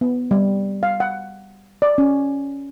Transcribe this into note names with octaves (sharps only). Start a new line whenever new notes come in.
B3
G3
F5
F#5
D5
C#4